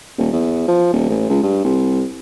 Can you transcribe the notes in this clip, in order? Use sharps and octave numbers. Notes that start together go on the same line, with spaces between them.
D#1
E2
F3
D#1
A1
C#2
G2
C2